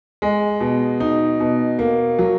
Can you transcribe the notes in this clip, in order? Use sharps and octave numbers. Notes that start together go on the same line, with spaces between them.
G#3
B2
D#4
B2
A#3
F#3